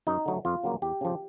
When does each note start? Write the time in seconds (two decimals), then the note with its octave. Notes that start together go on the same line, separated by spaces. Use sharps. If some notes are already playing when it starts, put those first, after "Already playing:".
0.07 F#2 D#4
0.26 D3 F#3 A3
0.45 F2 F4
0.64 C#3 F#3 A#3
0.82 E2 G4
1.01 C#3 F3